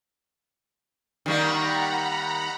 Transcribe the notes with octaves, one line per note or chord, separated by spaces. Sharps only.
D#3 G3 A#3 F#5 A#5 B5